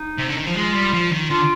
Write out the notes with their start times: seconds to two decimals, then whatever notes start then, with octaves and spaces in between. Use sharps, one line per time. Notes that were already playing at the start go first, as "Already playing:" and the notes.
Already playing: D#4
0.18 C3
0.28 D3
0.37 D#3
0.47 F3
0.56 G#3 F4
0.74 G3
0.93 F3
1.12 D#3
1.30 D3 F4